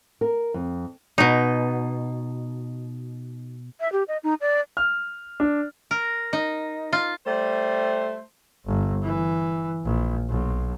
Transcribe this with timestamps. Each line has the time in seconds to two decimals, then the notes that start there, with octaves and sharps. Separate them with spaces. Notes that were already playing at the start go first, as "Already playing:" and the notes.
0.21 A#4
0.54 F2
1.18 B2 D#4
3.79 E5
3.92 G4
4.08 D#5
4.23 D#4
4.41 D5
4.77 F6
5.40 D4
5.91 A#4
6.33 D#4
6.93 F4
7.26 G3 A3 C5
8.66 G1
9.03 E3
9.84 A#1
10.29 B1